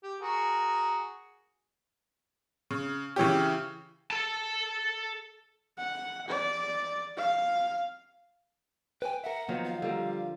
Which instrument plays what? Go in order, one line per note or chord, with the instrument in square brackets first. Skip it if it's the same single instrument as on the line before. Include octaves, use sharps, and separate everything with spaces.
[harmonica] G4
F#4 G#4 A#4
[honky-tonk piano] C#3
C#3 E3 C#4 G4
[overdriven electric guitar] A4 A5
[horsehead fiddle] F#5
D5
F5
[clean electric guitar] B4 G#5 [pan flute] G5
[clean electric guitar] A#4 E5 [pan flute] F#5
[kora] D#3 F3 F#3 [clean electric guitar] A#3 B3
[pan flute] F5
[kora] D3 F3 A#3 [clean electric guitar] G3